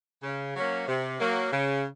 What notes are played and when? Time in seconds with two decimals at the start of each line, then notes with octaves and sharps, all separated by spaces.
0.23 C#3
0.56 F#3 A#3 C#4
0.88 C3
1.20 F#3 A#3
1.53 C#3